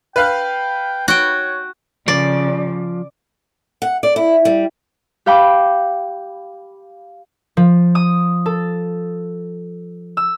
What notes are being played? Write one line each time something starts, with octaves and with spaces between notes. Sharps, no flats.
B4 F5 G5 F#6
F#4 C#5 G5
C#3 F3 D5
F#5
D5
E4
G3
G4 F5 G5 B5 D6
F3
D#6
A4
E6